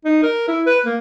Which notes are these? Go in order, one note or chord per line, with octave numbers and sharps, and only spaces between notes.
D#4
A#4
E4
B4
A#3